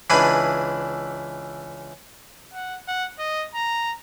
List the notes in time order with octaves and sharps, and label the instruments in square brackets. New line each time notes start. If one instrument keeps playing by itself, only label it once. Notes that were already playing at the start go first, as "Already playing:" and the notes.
[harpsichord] C#2 E3 D4 G#5 A5 B5
[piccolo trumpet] F#5
F#5
D#5
A#5